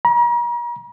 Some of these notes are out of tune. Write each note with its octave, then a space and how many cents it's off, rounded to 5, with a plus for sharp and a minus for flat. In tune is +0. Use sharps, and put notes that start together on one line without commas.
A#5 +40